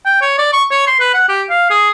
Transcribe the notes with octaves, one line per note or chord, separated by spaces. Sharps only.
G5
C#5
D5
C#6
C#5
C6
B4
F#5
G4
F5
G#4